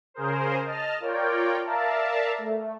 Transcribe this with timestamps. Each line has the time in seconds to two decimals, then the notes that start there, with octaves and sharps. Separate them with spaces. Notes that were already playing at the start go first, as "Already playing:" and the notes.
0.14 C#3 G#4 A#4 C5
0.63 D#5 A5 F6
1.00 F4 A#4 C#5 D5 G5
1.63 A#4 D5 E5 F5 A5 A#5
2.38 A3